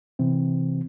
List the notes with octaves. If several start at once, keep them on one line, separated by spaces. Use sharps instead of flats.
C3 E3 C4